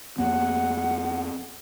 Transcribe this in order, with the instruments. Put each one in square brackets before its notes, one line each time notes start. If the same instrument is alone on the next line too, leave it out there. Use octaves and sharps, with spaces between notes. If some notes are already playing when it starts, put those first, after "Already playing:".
[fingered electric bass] F2 A#3 B3 [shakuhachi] F#5